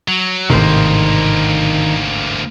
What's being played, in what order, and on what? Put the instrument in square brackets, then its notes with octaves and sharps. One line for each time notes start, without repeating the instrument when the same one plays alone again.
[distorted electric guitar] F#3
[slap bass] G#1 A2 C3 [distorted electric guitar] D2 A#3 [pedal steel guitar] D#3 C5